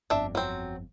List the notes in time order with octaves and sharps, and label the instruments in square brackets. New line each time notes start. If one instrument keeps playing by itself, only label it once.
[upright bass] G1 F2 [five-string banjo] D4 E5
[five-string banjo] F#3 C4